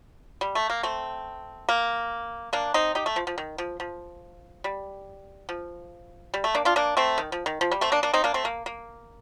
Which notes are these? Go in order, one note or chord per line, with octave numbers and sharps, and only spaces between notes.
G3
A3
A#3
A3 C4
A#3
A#3 D4
C4 D#4
D#4 G4
A3
F3
F3
D#3
F3
F3
G3
F3
G3
A3
A#3 D4
D4 F4
A#3 D4
A3 C4
D#3
F3
D#3
F3
G3
A3 C4
A#3 D4
A#3 D4
C4 D#4
A#3 D4
A3 C4
A#3
A#3